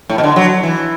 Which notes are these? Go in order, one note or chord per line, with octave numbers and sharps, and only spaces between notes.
A2
B2
D3
F#3
E3